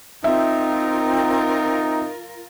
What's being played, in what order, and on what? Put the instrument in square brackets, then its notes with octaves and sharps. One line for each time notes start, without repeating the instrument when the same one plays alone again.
[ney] C4 [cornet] D#4 [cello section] F4 A#4 [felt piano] E5